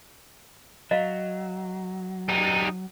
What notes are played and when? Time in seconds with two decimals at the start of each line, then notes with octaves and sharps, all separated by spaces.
0.91 F#3 D#5 F5
2.29 G3 D#4